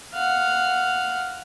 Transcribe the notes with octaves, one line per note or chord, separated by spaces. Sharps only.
F5 F#5